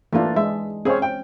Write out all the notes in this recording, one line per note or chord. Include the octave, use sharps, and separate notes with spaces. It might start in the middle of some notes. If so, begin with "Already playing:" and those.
E3 A3 A#3 D4 F4
G#3 E5
C4 C#4 G#4 C5 C#5
G5